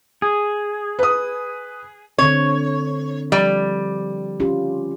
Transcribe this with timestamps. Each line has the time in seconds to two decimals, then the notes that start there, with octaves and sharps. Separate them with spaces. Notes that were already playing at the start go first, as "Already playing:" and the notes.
0.22 G#4
0.99 B4 D#6
2.18 D3 C4 C#5
3.32 F3 G3
4.40 C#4 F4 G4